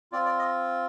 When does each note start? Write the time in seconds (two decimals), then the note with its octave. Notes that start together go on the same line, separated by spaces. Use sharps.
0.12 C4 F4 D5
0.26 D5
0.39 D#5